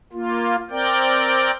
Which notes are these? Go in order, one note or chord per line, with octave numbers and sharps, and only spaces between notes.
A#3 F4
C4 A#4 D5 G5